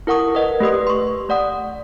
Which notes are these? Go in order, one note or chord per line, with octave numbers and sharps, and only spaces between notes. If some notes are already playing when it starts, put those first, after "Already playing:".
E4 A#4 F#5 C#6 D#6
A#4 B4 D#5 F#5
A3 G4 B4 D#6
C6 C#6
A3 D5 F#5 D#6